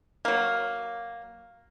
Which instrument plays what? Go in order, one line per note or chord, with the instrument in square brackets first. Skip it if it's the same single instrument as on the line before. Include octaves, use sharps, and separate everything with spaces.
[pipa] F#3 A#3